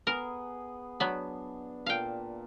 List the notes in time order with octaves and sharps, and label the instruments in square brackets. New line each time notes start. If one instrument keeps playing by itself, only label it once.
[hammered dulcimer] B3 G#4 [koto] A#4
[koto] F#3 B3 [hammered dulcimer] D4
[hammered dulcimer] A#2 A5 [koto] F5 G5